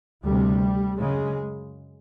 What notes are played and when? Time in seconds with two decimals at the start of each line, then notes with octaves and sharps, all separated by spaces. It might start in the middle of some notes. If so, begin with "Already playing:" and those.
0.24 D2 C3 G3
1.01 F#2 C#3 G#3